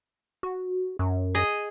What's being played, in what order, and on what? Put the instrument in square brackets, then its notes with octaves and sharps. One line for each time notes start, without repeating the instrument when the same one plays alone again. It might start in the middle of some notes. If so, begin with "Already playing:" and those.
[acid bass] F#4
F#2
[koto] G#4 D#5